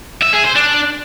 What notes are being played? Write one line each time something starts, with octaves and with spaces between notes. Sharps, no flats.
E5
G#4
C5
D4